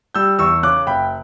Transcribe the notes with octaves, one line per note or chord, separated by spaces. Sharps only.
G3 E6 G6
E2 C#6 E6
C#3 D6 F#6
F#1 G5 B5